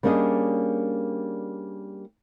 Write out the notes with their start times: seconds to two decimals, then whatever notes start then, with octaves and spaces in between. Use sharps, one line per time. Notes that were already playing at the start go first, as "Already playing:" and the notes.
0.03 G3 A#3 C#4 D4 G#4 D#5